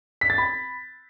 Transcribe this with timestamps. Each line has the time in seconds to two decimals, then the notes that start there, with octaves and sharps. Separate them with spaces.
0.21 B6
0.30 A6
0.38 B5